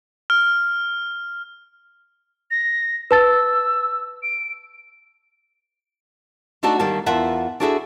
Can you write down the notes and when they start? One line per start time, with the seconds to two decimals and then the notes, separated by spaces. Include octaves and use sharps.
0.30 F6
2.51 A#6
3.11 B4 A5 E6 A6
4.23 D7
6.63 A3 D4 D#4 F#4 D5 A5
6.79 D2 D#3 G3 A#3 A5
7.06 E2 F4 A#4 E5 F#5 A5
7.60 D4 E4 F#4 G#4 A4 E5